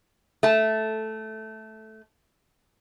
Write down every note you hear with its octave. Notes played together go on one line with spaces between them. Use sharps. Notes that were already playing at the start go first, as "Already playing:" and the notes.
A3 A5